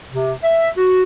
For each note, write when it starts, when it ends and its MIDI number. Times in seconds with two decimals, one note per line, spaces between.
0.11 0.33 48
0.43 0.70 76
0.77 1.03 66